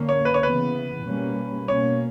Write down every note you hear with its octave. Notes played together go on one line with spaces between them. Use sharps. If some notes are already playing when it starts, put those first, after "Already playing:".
Already playing: D3 A#3 C#4
C#5
B4
C#5
C#3 E3 B3 B4
B2 G3 A#3 C#4
B2 A#3 C#4 C#5